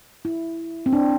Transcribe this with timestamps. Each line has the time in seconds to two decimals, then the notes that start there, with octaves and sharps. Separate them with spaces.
0.25 E4
0.86 C4
0.93 D4